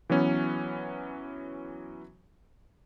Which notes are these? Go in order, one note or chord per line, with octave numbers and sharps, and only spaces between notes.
E3 F#3 B3 C#4